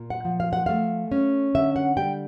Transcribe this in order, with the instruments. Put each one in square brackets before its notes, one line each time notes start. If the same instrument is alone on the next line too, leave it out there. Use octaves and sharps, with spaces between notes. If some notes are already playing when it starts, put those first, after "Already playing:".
Already playing: [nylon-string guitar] A#2
F#5
F3
F5
F#5
A3 F5
C#4
D3 E5
F#5
G3 G5